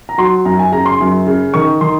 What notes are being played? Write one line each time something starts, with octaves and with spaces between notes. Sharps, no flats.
A#5
F#3 C6
F#2 A#5
G#5
C#3 A#5
C6
F#2
C#3
D#3 C#6
D#3 C6